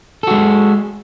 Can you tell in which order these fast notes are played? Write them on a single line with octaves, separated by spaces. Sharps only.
A4 F#4 G#3